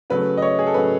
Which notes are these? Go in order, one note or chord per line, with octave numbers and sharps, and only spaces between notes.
C#3 F#3 A3 B4
D#5
C#5
G#4
A4
C#3 F#3 A3 B4